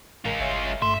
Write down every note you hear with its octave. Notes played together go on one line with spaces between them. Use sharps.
A1 G#3 F4 A#4 B6
G1 C#5 E5 G#5
G2 A3 E5 C6